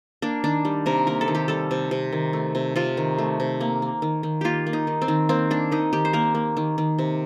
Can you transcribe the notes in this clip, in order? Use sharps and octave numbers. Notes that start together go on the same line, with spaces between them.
A#3 D4
D#3 D4
G3
C3 A#4
A#3 A#4
A4
D#3
G4
G3 A4
C3
C3
D#3
A3
C3
C3 F4
D#3
A3
C3
A#3
A#3
D#3
D#3
A#3 F4 G4
A#3
D#4
D#3
C4
D#3
A#3 C4
A#3 D4
D#3 D#4
D#3 G4
C5
A#3 A#4
A#3
D#3
D#3
C3